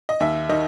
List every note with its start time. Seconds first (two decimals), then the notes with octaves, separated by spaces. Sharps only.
0.09 D#5
0.20 D#2 E5
0.49 D#3 D#5